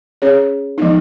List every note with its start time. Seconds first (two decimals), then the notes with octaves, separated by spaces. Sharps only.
0.22 C#4 G#4 C#5
0.78 F3 G#3 B3 D#4